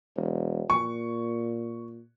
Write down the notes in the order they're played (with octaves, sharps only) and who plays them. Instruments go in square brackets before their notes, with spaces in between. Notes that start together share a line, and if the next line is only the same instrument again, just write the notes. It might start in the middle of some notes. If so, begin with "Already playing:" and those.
[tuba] E1
[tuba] A#2 [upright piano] C#6